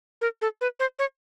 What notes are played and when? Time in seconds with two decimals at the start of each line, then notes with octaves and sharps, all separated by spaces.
0.21 A#4
0.42 A4
0.61 B4
0.80 C5
0.99 C#5